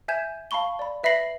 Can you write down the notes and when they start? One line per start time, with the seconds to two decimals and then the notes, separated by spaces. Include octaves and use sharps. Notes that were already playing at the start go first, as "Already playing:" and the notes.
0.08 E5 G#5 G6 G#6 E7
0.51 F5 A5 B5 C#6 G7
0.79 D5 B5
1.04 B4 E5 B5 A#6 C7 F#7